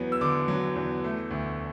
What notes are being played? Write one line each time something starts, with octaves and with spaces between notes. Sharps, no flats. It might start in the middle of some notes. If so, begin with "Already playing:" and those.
Already playing: E2 F#3 B3
E6
D3 D6
F#3
E2
A3
D2